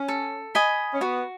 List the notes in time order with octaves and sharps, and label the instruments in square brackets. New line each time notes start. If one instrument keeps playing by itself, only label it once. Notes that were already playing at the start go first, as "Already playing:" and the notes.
Already playing: [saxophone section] C#4
[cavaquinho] A4
D#5 G#5 B5
[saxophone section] C#4
[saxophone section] B3 [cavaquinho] F#4